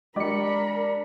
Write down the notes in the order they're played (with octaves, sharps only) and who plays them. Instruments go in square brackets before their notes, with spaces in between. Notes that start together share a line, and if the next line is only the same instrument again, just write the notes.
[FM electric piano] G#3 C#7 [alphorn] D4 [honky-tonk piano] G4 D5 D6 [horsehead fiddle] A#4 B5